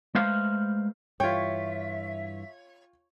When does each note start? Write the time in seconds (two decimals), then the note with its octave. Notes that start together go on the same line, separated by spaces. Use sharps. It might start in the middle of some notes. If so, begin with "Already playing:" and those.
0.15 G#3 A3 B4 C5 F5
1.20 G2 E3 F4 C#5 E5 G5